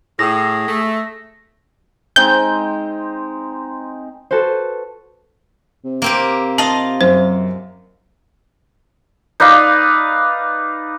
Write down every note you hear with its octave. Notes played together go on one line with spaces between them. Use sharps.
A2 G#4 A#6
A3
G#3 C4 D#4 G6
F#4 A4 B4 C5
C3
A#3 C4 G4
F4 D#5 F5 A5
F#2 C5
D#4 B4 D5 F5